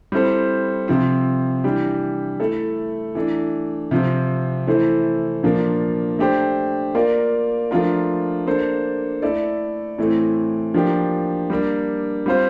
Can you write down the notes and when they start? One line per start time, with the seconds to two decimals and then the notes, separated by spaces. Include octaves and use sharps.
0.12 G3 C4 E4 A4 C5
0.88 C3 F3 C4
1.64 E3 G3 D4 G4
2.40 A3 E4 A4
3.15 E3 A3 D4
3.91 C3 F3 C4
4.67 E3 A3 E4 A4 C5
5.43 A#2 F3 A#3 D4
6.19 A3 D4 G4 C5
6.95 A#3 F4 A#4 D5
7.71 F3 A3 D4 F4 A#4
8.46 A#3 D4 A4 C5
9.22 A3 E4 A4 D5
9.98 A2 E3 A3 C4
10.74 F3 A#3 D4 G4
11.50 G3 A#3 D4
12.26 G3 C4 F4 C5